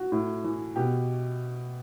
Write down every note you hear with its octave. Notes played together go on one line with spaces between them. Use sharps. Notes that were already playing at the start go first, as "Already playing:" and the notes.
Already playing: F#4
A2
E3
B2 G4